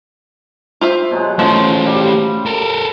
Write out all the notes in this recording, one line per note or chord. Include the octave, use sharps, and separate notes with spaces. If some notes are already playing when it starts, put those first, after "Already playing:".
F4 C5 E5
B2 F#3 G#3
F3 A3 C#4 C5
F4
G3
A4 A#4